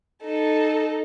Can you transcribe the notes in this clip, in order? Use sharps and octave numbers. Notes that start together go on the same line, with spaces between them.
D#4 A4